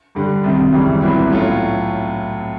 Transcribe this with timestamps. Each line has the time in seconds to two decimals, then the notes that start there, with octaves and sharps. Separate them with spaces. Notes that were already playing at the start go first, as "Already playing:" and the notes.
0.15 G2 D3 G3
0.44 C2 C3 D#3
0.72 G#1 F#2 C#3 E3 G3
1.01 C2 A#2 F#3 B3 E4
1.30 A2 F#3 A3 C#4 F4